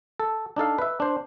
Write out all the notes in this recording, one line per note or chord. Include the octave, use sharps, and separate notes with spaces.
A4
D4 D#4 A4 F5
B4 E5
D4 C5